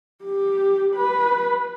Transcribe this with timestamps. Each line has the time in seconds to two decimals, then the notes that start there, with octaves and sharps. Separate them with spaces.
0.25 G4
0.95 B4